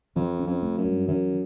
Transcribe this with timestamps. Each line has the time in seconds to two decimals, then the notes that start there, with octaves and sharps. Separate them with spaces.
0.16 F2 E3
0.39 C#4
0.47 F2
0.63 A3
0.77 F#2
0.84 G2
1.08 F#2 E3